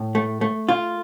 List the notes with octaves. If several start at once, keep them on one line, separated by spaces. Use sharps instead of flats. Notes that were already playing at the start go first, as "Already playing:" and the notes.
Already playing: A2
A3
A3
F4